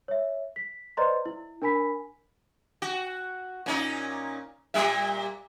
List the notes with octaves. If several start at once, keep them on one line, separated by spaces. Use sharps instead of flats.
C#5 E5
B6
B4 C5 D5 D#5 A#5 C6
E4
D4 A#4 G#5 B5 B6
F#4
A#2 C#4 D#4
A#2 G3 E5